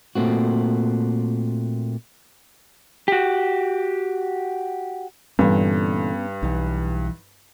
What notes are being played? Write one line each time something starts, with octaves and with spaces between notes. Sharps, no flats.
A#2 A3 C4 F#4
F#4 G4
G2 A#2 D3 E3 B3 C#4
B1 E3 D#4